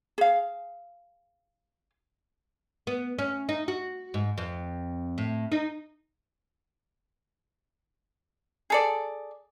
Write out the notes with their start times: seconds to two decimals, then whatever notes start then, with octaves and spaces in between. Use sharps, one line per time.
0.18 G#4 F5
2.87 B3
3.19 C#4
3.49 D#4
3.68 F#4
4.14 G#2
4.38 F2
5.18 A2
5.52 D#4
8.70 G#4 A4 D5